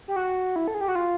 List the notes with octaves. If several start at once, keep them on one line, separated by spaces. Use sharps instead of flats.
G4
F#4
E4
A4
G#4
G4
F#4
F4